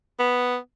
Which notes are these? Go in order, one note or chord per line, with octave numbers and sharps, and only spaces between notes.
B3